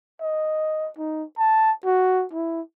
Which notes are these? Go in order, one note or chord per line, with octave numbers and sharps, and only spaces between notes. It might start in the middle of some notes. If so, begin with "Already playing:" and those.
D#5
D#4
A5
F#4
E4